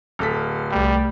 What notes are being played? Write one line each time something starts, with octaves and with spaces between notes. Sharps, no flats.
D1 A4 F6 B6
C2 G3 A3 G5